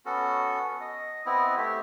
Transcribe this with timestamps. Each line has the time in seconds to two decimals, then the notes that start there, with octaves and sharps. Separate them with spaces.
0.06 B3 C#4 F#4 A4
0.81 D#5
1.26 B3 C4 E4 D#5
1.57 A3 G4